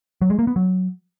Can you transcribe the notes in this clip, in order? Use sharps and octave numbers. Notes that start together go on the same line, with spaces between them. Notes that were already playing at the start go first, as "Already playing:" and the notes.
F#3
G#3
A#3
B3
F#3